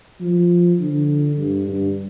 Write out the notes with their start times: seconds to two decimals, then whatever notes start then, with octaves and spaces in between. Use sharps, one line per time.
0.20 F3
0.80 D3
1.38 G2
1.68 G2